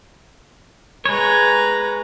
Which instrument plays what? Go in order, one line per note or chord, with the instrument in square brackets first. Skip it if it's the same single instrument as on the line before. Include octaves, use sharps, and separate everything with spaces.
[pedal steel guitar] G#3 C#5 [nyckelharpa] B4 A#5